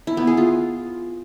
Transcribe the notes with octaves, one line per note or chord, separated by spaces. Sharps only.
E4
B3
G#4
F4